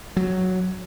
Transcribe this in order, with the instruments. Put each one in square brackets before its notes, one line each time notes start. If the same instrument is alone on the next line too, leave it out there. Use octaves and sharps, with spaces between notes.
[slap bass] F#3